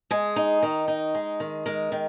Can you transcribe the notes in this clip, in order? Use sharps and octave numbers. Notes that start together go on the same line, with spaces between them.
G#3 G#4
D#4
D#3
D#4
G#3
D#3
G#3 A#4
D#3